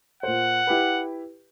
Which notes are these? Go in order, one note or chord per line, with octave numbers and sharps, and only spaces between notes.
A#2 C5 F#5
E4 G4 B4